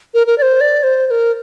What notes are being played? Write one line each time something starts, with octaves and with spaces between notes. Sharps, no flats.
A#4
A#4
D5
C5
D5
C5
C5
A#4